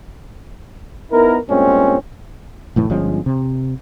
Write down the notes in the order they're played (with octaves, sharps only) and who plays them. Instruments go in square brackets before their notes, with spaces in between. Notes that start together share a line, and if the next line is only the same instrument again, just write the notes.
[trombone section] B3 D#4 E4 A#4
G2 A#2 G#3 C4 C#4
[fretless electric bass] F1 A2 E3
G1 F3 G#3 C#4
C3